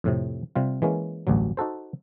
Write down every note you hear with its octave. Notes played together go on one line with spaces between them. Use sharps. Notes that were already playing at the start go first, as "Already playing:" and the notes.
F2 A2 C3
C3 G3 F4
E3 G#3 A#3 C#4
A1 D2 G2 F#3
D#4 F#4 A4 C5